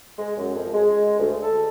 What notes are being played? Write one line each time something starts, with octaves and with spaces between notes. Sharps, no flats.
G#3
F#2
F2
G#3
D2
A4